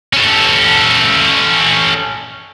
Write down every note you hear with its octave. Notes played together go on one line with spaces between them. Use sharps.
C#4 A4